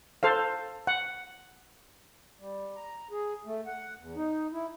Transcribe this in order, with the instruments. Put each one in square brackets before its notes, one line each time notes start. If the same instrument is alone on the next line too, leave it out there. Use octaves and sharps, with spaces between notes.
[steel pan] A4 C5 F5
F#5
[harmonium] G3
A#5
G#4
A3
F#5
E2
D#4
E4